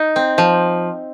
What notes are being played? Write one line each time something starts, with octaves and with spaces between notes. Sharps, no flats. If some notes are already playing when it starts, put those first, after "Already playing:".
Already playing: D#4
C4
F3